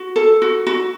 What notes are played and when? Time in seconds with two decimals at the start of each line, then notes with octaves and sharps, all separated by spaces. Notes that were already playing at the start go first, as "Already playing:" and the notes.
Already playing: F#4
0.16 A4
0.42 F#4
0.67 F#4